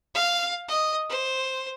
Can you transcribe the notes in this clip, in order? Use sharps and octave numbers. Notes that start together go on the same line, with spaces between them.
F5
D#5
C5